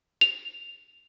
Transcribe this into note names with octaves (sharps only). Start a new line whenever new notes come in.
F7